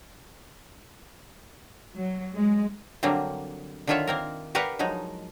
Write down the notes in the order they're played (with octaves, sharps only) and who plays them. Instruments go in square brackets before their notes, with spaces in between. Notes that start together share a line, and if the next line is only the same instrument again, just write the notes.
[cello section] F#3
G#3
[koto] D3 F#3 G3 A#3 C4
D3 D#3 F4 C#5 E5 F#5
A#3 C4 A#4
G4 A#4 B4 D5 F5 F#5
F3 F#3 G#3 D#4